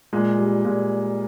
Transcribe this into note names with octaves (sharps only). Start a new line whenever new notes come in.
A#2 G#3
G3
A#2 G#3